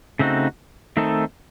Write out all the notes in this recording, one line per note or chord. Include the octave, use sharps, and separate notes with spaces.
C#3 A3 C4 D#4 F#4
D#3 A3 C4 D#4 A4